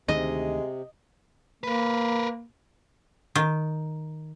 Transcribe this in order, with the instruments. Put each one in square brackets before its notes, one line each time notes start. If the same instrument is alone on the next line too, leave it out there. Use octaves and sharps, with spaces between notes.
[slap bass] D2 D#3 [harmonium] C3 [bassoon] G#3 [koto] D#5
[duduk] A#3 [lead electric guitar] A#4 B4
[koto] D#3